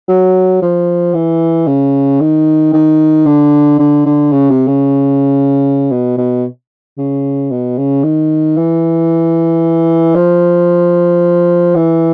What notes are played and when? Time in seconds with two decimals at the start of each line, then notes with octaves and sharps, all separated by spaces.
0.08 F#3
0.62 F3
1.14 E3
1.67 C#3
2.21 D#3
2.73 D#3
3.26 D3
3.79 D3
4.06 D3
4.32 C#3
4.50 C3
4.68 C#3
5.91 B2
6.18 B2
6.98 C#3
7.51 B2
7.78 C#3
8.04 D#3
8.57 E3
10.15 F3
11.76 E3